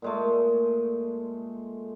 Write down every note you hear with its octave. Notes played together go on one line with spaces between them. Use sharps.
A#2 G#3 A3